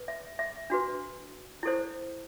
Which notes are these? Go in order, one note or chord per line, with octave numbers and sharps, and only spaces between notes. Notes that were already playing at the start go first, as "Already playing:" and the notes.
Already playing: B4
E5
E5
D4 F#4 B4
E4 A4 C5